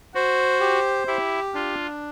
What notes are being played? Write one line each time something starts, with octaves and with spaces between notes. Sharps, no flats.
F#4 C5
G4
E4 G4
D4 F4